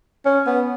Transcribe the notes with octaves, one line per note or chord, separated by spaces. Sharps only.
C#4
B3